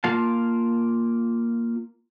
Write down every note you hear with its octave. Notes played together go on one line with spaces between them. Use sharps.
A#3 F4 F5 A5